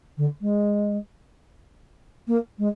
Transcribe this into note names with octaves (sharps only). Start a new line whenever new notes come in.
D3
G#3
A#3
G#3